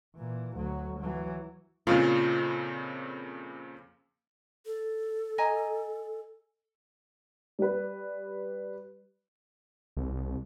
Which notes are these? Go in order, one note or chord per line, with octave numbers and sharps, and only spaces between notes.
A#2 E3
D2 F#3
E3 F#3
F2 A#2 C#3 F4
A4
D#5 G#5 A#5
G3 B4
C2